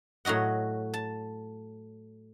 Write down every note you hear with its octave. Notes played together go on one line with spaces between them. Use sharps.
A2 F#3 F#4 D#5 F#5
A5